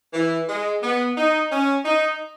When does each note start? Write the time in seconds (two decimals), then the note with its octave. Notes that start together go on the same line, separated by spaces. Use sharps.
0.14 E3
0.49 G#3
0.83 B3
1.17 D#4
1.51 C#4
1.85 D#4